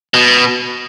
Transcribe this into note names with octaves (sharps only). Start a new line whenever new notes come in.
B2